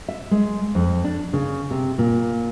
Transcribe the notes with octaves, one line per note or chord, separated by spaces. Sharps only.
E5
G#3
F2
D4
C#3
C3
A#2